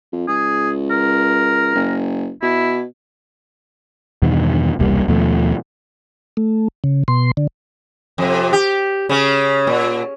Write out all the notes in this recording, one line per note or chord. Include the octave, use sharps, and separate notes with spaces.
F2
C#2 G#4
A#4
F#1
B2 E4
E2 G2 B2 D#3
E1 C2 G3 A#3
D#2 B2 F3 A3
A3
C#3
B2 C6
D3
F2 C3
G4
C#3 C#4
A#2